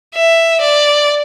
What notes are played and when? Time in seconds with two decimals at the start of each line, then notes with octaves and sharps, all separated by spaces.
0.15 E5
0.61 D5